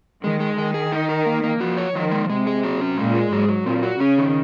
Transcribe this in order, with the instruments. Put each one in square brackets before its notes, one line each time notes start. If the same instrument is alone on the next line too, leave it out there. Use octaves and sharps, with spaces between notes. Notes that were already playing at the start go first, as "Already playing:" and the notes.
[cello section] D#3 [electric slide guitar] G#3
[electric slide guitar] G#3
[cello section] D#3 [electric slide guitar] G#4
[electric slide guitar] G#4
D#4
A#4
A#3
A#3
[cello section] F3 [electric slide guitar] F#4
[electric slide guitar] C#5
[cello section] D#3 [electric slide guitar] F3
[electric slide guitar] G#3
[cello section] C3 [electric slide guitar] G#3
[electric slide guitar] G#4
F#3
C#4
[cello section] A#2 [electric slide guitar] G#3
[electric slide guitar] G#4
[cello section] G#2 [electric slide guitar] F#3
[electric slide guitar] F#3
[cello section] A#2 [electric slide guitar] C4
[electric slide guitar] F#4
[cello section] C#3 [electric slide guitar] C#4
[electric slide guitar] D#3